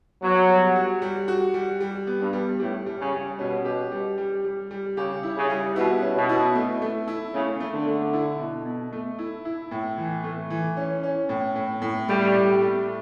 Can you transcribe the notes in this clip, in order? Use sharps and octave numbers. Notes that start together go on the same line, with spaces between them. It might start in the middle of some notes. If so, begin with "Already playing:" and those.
F#3 B3
G3
F#4
G3
F#4
G3
G3
B3
G2
G3
A2 G3
G3
C#3
G3
B2 C#4
G4
G3
G3
G3
G3
C#3 G4
E4
C#3
G3
B2 E4
C#4
B2
E4
A3
A3
E4
C#3 A3
A3
D3
A3
E4
B2
B2
A3
E4
E4
A2
E3
A3
E3
C#4
C#4
A2
A2
A2
G3 A3
A2
A3